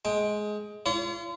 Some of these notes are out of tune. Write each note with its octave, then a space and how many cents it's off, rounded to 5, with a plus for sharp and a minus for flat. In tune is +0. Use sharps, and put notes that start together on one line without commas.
G#3 +15 G5 +15
F4 -35 C#5 +40